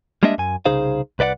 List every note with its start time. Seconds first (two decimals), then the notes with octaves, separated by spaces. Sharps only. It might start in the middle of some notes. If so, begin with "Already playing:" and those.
0.23 G3 G#3 A#3 D4 D#5 E5
0.38 F#2 G#5
0.66 C2 C#3 D#4 G#4 C5 F5
1.19 C2 B4 D5 D#5 F#5